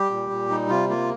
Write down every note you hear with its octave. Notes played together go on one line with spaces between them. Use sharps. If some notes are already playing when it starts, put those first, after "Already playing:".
Already playing: G3 G4
A#2
A#2
G3 D#4
C3 F4
A#3 F4